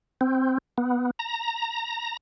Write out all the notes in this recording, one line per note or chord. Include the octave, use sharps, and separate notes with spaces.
C4
B3
A#5